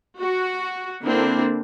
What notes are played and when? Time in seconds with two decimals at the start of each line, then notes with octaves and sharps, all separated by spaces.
0.20 F#4
1.04 D3 A#3 C4 D4 E4